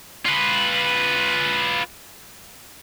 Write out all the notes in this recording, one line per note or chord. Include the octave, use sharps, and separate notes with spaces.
F4 B4